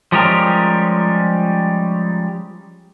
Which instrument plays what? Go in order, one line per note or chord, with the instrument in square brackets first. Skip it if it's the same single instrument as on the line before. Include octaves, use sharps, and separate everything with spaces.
[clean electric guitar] F3 G3 G#3 C#4 G4 A#4